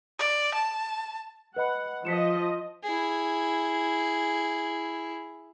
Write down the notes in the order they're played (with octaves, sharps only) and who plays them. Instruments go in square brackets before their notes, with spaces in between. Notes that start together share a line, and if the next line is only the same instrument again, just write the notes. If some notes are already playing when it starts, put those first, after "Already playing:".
[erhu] D5
A5
[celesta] B4 D#5 B5 [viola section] F#5
[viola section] F3 D#5 [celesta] B6 C#7 E7
[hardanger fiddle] E4 G#4